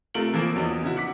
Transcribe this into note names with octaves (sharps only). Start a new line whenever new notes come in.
C3 A3 F4 A#4 D7 F#7
E3 F3 A#3 C4
E2 F3 F#3 B3 C#4 D#4
C#3 E4 F#4
F#5 D6 B6